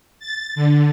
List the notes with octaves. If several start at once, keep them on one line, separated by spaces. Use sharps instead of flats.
A6
D3